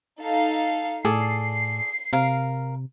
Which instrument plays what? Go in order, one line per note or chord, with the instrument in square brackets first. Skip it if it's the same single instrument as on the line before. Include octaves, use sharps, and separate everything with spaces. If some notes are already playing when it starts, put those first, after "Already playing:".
[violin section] D#4 A4 F5
[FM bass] A2 [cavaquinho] G#4 A4 D5 [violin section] C7
[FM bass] C3 [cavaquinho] A#4 F5